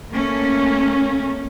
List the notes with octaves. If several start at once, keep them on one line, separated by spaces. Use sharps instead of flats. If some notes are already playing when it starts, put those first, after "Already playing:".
A3 A#3 C#4